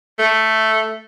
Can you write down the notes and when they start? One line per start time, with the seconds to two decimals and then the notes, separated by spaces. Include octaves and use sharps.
0.19 A3